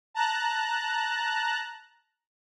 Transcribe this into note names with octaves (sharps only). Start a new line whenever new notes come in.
A5 A#5 F#6